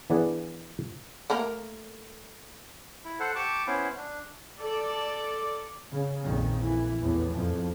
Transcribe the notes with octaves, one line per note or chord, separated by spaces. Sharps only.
E3 B3 D4 G#4 D5 F#5
A3 A#3 A#4
E4
A4 C5 F#5
G4 A5 C#6 D6
B3 C#4 E4 C5
D4
A4 D5
C#3
A#1 F2 A#2 D#3
E3
E2 A2 E3 B3
F2 F3